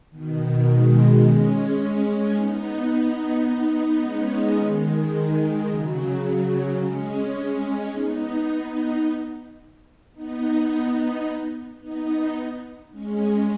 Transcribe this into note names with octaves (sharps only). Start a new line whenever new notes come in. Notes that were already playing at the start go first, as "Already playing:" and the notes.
B2 D#3
D#3 G#3
G#3 C#4
B3 D#4
B3 D#4
G#3 C#4
D#3 G#3
D#3 G#3
C#3 F#3
G#3 C#4
B3 D#4
B3 D#4
B3 D#4
G#3 C#4